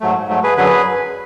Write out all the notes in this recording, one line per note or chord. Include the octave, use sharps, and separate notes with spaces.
G#2 F#3 A3
G#2 F#3 A3
G#4 B4
F#2 D3 F#3 G#4 B4